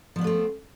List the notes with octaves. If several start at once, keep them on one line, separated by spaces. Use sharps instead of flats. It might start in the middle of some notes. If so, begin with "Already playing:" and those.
F3 A3 B3 C4 D4